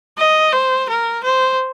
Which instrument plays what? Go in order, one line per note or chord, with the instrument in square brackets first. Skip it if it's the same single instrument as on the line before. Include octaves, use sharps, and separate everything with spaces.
[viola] D#5
C5
A#4
C5